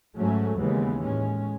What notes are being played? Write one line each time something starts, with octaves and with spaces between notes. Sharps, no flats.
G#2 F#3 A3 C#4
D#2 C#3 E3 G#3 B3
A2 G#3 C#4